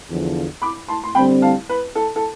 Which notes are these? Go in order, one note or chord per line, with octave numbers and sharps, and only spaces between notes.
E2 D3 F3
B5 D6
A5 C6
C6
D3 G3 C4 G5 B5
F5 A5
B4
A4
A4